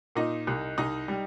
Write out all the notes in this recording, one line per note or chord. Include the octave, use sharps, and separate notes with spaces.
A#2 D#4 D#5
C2
C2 D#4 D#5
G3